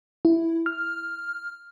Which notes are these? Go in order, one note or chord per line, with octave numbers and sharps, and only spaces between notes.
E4
F6